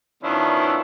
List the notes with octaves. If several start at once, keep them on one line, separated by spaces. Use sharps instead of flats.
D#3 F3 B3 C#4 D4 E4